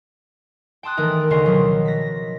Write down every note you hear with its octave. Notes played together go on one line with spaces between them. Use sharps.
G5 A5 C6 D#6 F#6
D#3 E3 A3 D#4 A#4
D2 C#3 C#5 D#5 C6 C7
B2 D#3 F3 F#3
A#6 B6